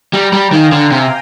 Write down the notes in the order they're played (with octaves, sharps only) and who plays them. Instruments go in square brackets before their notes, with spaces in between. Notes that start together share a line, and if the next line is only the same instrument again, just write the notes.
[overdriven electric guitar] G3 [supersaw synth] G5 A#5
[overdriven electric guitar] G3
[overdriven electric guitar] D#3 [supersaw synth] F5 G#5
[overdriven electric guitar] D3
C3